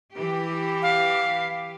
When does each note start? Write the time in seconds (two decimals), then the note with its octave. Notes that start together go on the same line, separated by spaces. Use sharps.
0.15 E3 G4
0.83 F5